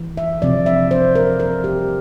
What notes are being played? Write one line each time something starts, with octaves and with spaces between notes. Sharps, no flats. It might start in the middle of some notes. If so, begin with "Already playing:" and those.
Already playing: E3
E5
C3 F3 C4 D5
E5
C5
A#4
A#4
G4